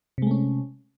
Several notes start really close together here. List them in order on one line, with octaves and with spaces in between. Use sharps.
C3 G#3 A3 C#4